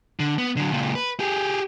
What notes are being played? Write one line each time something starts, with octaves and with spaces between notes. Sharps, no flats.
D3
B3
D3 F#3
C#2 A#2
B4
G4 G#4